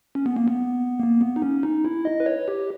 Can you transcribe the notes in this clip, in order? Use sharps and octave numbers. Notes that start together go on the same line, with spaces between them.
C#4
B3
A#3
B3
A#3
B3
D#4
C#4
D#4
E4
D#5
B4
C#5
G4